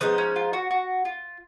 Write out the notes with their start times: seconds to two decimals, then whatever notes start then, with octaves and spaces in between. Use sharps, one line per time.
0.01 F3 G#3 B3 D#4
0.18 C#4
0.36 F4
0.53 F#4
0.71 F#4
1.05 F4